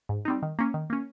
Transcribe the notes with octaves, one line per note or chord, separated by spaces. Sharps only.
G#2
G3 C4 D#4
D#3
A#3 C#4
D#3
A#3 C#4